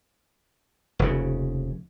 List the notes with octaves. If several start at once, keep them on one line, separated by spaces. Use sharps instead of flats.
F1 D#2 C#3